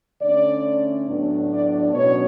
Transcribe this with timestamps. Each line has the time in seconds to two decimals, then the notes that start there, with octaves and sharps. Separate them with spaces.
0.21 D3 A3 C#4 D5
1.07 A2 F#3 B3 D4
1.51 D5
1.93 B2 F#3 C#4 C#5